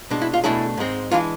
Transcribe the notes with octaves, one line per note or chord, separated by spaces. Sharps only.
B2 G#3 D4
E4
F4
B2 A3 D4 E4 G#4
G#2 G#3 C4
E3 G#3 D4 F4